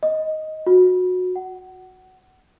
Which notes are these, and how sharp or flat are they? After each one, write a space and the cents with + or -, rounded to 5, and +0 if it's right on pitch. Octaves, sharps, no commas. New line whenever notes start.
D#5 +10
F#4 -20
F#5 +20